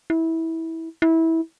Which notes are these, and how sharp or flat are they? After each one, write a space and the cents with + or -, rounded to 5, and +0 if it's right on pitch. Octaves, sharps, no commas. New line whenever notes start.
E4 -20
E4 -20